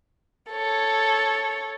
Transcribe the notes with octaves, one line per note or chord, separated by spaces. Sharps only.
A4 C#5